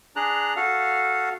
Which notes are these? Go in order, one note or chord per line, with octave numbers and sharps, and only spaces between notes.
D4 G#4 A#5 F#6
F#4 A4 F5